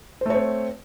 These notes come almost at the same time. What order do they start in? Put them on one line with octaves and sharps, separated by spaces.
C5 A3 C#5 C4